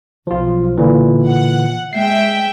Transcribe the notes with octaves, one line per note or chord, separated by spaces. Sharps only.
B1 F3 F4
A#2 D3 E3
F#5
G#3 E5 G5 C7